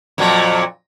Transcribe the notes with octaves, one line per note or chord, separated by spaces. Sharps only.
F2 A#2 F#3